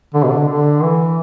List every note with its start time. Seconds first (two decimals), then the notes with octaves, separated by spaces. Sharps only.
0.14 D3
0.24 B2
0.31 D3
0.48 D3
0.82 E3